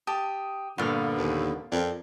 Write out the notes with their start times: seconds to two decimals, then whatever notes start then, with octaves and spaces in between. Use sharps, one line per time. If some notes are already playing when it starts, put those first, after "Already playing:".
0.07 G4 A5 D#6
0.78 G2 A#2 D3 B3 F4 F5
1.17 D#2
1.72 F2 A#4 D5